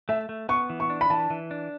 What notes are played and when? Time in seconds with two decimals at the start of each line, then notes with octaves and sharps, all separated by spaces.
0.09 A3 E5
0.29 A3
0.49 B3 C#6
0.70 E3
0.80 C#6
0.90 D4
1.01 B5
1.10 E3 A5
1.30 E3
1.51 D4